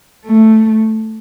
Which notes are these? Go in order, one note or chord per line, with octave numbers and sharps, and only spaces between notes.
A3